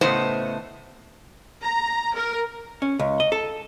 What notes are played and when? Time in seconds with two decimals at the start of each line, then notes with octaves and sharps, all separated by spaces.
0.01 A2 C#3 A3 B3 C5 D#5
1.63 A#5
2.14 A#4
2.82 C#4
2.99 C#2
3.20 D#5
3.32 A4